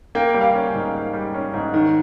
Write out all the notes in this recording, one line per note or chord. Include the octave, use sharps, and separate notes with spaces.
A#3 G5
G3
F5
C#4
G#5
G#2
A#3
G3
C#4
G#2
D#3